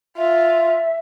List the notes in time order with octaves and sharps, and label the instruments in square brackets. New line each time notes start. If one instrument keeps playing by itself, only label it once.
[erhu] F4 [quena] E5